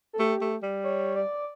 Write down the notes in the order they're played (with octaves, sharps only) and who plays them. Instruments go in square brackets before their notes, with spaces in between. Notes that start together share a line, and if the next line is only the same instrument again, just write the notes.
[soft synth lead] A4
[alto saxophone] A3 [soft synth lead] G4
[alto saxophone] A3
G3
[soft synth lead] C#5
D5